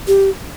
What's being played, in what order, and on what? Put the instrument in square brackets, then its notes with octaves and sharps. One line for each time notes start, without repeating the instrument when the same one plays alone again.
[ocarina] G4